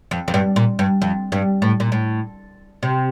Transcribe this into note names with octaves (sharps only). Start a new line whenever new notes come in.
F2
F2
G2
A#2
G2
F2
G2
A2
A#2
A2
C3